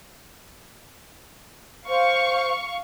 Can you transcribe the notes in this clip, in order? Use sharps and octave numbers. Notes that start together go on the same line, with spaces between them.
C5 F5 C#6